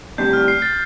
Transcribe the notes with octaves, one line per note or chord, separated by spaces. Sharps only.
D2 C3 G3 D4 G6
F6
C7
A6